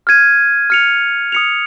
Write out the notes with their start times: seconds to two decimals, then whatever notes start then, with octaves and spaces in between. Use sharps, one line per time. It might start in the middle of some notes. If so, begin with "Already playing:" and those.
0.07 F6 G#6 D#7
0.70 F6 C#7 F7
1.32 D#6 C#7 F7